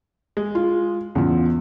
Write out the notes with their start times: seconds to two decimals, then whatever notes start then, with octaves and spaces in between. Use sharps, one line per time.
0.37 G#3
0.55 F4
1.15 E2 C#3 F4